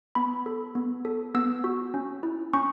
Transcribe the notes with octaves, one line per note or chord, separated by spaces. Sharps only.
B3 B5
A4
B3
A4
B3 E6
F#4
C#4
E4
C#4 C#6